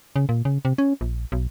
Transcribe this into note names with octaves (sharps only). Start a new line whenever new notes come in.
C#3
A#2
C#3
C3
C#4
A#1
B1